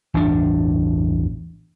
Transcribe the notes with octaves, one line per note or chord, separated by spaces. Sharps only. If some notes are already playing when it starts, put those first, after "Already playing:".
A1 E2 G2 D4